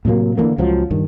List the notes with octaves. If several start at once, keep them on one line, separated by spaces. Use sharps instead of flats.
A2 C3 F#3 A#3
D3 E3 F#3 A#3
C#2 F3 F#3
G2 D#3